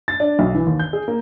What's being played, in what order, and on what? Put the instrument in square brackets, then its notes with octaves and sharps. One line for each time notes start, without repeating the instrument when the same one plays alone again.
[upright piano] A6
D4
B1
E3
D#2
G6
G#4
A#3